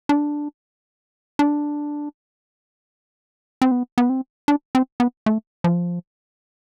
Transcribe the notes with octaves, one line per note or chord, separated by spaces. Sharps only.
D4
D4
C4
B3
B3
C4
D4
C4
B3
A3
F3